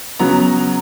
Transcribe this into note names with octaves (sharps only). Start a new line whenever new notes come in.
C#3 F#3 B3 A#5